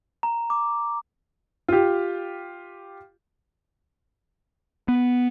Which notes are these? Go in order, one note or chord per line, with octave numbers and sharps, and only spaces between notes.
A#5
D6
F4 G4
B3